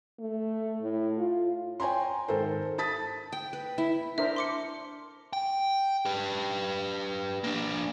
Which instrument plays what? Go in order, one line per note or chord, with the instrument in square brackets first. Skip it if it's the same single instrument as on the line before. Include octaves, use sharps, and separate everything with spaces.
[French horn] A3
A2
F4
[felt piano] C#5 G5 G#5 A#5 C6
G#1 A4 A#4 C5
A5 D#6 A6 B6
[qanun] G5
B4
E4
[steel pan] D4 A#4 C5 [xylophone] E5
[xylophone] C6 D6 C#7
[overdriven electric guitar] G5
G4 B4
A#3 D4